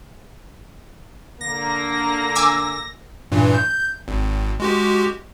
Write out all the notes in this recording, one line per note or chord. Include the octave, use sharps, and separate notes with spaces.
D3 A#3 A#6
G#5 D6 E6
G2 A#2 E3
G6
G#1
G#3 F#4 G4